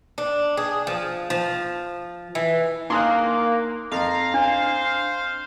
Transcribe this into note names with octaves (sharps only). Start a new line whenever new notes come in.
D4
G#4
F3
F3
E3
A#3 D4 D#4 C6 D#6 F#6
F2 F5 A#5
D4 C5